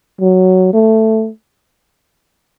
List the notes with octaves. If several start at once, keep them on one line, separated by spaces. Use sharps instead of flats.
F#3
A3